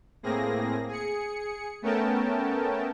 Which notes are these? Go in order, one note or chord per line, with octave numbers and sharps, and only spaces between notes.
A2 A#3 C4 G#4 A#6
G#4 C#7
A3 B3 C#4 A#4 G5 A5